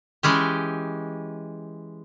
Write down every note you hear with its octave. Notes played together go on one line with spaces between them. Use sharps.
E3 G#3 C#4 G4